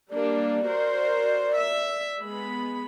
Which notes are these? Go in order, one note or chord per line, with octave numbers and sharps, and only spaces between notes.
G3 A#3 D4 D5
F#4 A#4 C5
E5
G#3 B3 B5